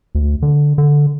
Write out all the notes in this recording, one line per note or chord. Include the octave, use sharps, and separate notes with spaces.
D2
D3
D3